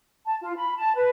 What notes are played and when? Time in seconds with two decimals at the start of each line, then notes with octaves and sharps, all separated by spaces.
0.25 A5
0.41 F4
0.56 B5
0.77 A5
0.95 B4